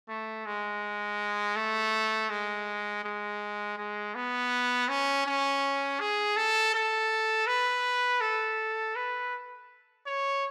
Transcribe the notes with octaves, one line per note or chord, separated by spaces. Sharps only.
A3
G#3
A3
G#3
G#3
G#3
B3
C#4
C#4
G#4
A4
A4
B4
A4
B4
C#5